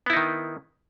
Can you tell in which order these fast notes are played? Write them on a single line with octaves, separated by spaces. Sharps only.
B3 E4 D#4 D#3